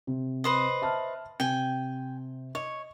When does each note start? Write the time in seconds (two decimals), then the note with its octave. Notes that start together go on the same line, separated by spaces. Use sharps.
0.07 C3
0.44 B4 C5 D#5
0.82 E5 A5 F6
1.40 C3 G5 G#5
2.55 C#5 D#5